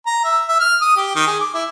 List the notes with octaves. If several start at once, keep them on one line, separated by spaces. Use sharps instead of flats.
A#5
E5
E5
F6
D#6
G4
D#3
G#4
D6
E4